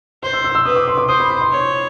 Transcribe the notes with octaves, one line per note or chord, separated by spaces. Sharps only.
C5 C6
E6
E6
E6
B4 D#6
D6
C6
D6
C5 D#6
B5
B5
C6
C#5